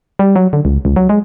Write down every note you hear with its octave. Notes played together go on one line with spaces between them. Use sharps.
G3
F#3
D3
C#2
C#2
F#3
G#3